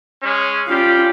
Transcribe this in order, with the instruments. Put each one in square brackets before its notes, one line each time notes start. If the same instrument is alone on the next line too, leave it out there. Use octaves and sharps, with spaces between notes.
[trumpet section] G#3 C#4
[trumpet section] G3 G4 F5 [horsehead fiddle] C#4 F4